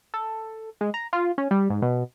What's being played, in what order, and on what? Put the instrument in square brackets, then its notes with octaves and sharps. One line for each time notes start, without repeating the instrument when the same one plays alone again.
[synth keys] A4
G#3
A#5
F4
C#4
G3
G#2
B2